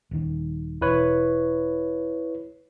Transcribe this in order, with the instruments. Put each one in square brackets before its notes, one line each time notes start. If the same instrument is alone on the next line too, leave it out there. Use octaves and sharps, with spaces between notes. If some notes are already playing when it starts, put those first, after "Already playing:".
[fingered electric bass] D#1 D#3
[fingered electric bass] E1 [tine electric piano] E4 B4 C#5